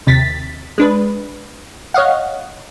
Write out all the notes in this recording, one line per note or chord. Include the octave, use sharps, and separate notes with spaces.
D#2 C3 A6 B6
G#3 D4 B4
C#5 D#5 F5 F#5